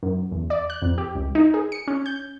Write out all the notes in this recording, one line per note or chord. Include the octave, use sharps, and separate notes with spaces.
F#2
E2
D5
F#6
F2
G4
C#2
D#4
G#4
C#7
C#4
G6